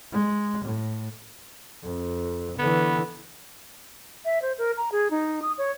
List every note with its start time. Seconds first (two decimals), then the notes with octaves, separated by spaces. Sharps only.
0.12 G#3
0.64 A2
1.83 F2
2.59 D3 E3 B3
4.25 E5
4.42 C5
4.58 A#4
4.77 A#5
4.92 G#4
5.11 D#4
5.42 D#6
5.58 C#5